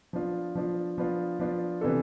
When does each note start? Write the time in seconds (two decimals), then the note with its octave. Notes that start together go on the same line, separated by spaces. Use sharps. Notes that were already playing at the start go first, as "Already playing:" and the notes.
0.13 F3 B3 D4 F4
0.55 F3 B3 D4 F4
0.98 F3 B3 D4 F4
1.39 F3 B3 D4 F4
1.81 C3 E3 B3 D4 A4